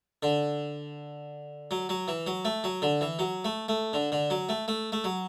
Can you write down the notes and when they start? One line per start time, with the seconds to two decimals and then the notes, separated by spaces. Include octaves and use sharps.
0.23 D3
1.71 F#3
1.89 F#3
2.08 E3
2.27 F#3
2.45 A3
2.64 F#3
2.82 D3
3.01 E3
3.19 F#3
3.45 A3
3.68 A3
3.93 D3
4.12 D3
4.30 F#3
4.49 A3
4.68 A3
4.92 A3
5.04 F#3